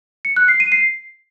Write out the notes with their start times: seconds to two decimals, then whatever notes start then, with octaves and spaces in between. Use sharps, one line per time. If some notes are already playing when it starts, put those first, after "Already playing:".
0.25 C#7
0.36 F#6
0.48 C7
0.60 D#7
0.72 C7